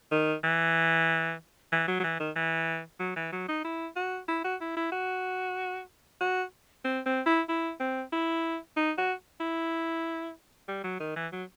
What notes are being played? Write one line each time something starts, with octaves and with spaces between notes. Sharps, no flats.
D#3
E3
E3
F#3
F#3
E3
D#3
E3
F#3
E3
F#3
D#4
E4
F#4
E4
F#4
E4
E4
F#4
F#4
C4
C4
E4
E4
C4
E4
D#4
F#4
E4
G3
F#3
D#3
E3
F#3